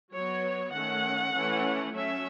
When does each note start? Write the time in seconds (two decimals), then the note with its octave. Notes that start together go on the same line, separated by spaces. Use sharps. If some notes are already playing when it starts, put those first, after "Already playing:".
0.13 F#3 B3 C#5
0.73 D#3 A3 C#4 F#5
1.33 E3 A3 C#4
1.94 F#3 A3 C#4 E5